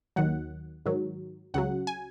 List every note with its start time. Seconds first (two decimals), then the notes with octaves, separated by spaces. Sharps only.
0.16 D#2 D#3 F#3 F#5
0.86 G#2 D#3 F#3
1.54 C#2 C#3 F#3 F#5
1.87 G#5